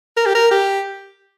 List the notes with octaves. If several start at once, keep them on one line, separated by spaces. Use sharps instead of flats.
A#4
G4
A#4
G4